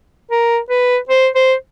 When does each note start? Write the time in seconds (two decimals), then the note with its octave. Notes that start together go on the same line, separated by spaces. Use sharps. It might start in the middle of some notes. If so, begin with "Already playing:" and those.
0.31 A#4
0.70 B4
1.09 C5
1.35 C5